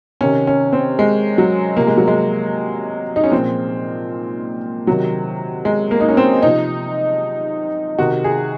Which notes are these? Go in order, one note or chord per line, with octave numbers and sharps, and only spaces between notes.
C3 D#3 C#4
C#4
C4
G#3
F#3
C3 F3 A#3
G#3
F#3
G#3
D#4
C#4
A#2 F3 C4
C3 D#3 F#3
G#3
A#3
D#4
C#4
C4
C3 F3 D#4
C3 D#3 F#4
G#4